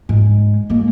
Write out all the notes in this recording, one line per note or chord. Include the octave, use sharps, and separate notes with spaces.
G#2
G#3 A#3